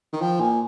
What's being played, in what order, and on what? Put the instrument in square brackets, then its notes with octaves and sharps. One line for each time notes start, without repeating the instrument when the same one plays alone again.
[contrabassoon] D#3
[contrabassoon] F3 [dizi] G5
[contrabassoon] A#2 [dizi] G#5